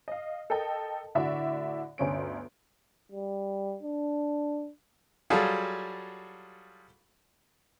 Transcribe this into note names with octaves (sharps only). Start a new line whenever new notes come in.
D#5 F5
A4 A#4 D#5 G5 A5
A2 D3 F#4 D5 E5
G1 D2 C#4 D7
G3
D4
F#3 G3 F4 F#4 G#4 A4